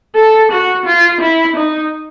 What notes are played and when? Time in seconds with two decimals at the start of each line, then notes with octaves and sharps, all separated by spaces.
0.15 A4
0.51 F#4
0.86 F4
1.21 E4
1.56 D#4